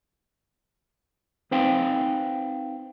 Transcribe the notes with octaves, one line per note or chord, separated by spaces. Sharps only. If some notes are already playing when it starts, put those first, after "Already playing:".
C4 D#4 B4 C5 F5 G5